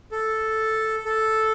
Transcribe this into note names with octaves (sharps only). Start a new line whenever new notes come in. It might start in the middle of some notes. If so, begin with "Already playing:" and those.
A4
A4